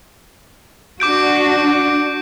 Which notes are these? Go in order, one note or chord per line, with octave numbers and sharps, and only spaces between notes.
D4 F#4 D6 G6 D7